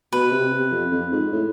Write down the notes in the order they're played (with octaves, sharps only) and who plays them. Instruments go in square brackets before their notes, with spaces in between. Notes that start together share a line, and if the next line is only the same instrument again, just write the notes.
[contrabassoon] B2 [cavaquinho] B4
[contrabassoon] C3
C3
F2
F2
G#2
A2